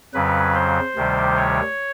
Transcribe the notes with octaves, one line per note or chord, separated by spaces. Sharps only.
F2 C#3 F#3 B4
C5
D2 C3 D#3 G3
C#5